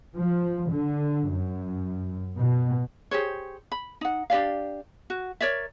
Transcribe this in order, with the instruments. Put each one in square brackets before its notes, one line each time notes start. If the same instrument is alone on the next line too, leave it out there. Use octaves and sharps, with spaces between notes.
[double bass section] F3
D3
F#2
B2
[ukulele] G4 G#4 C5 C#5
B5
D#4 F#5
D4 G4 D5 F5
F#4
A#4 C#5 D5 E5